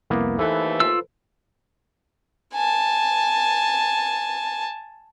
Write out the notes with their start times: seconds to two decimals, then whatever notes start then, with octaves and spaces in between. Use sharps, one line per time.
0.10 C2 F2 A#3 B3 E4
0.39 D#2 E3 A3 A4 B4 C5
0.80 F4 E6
2.54 G#5 A5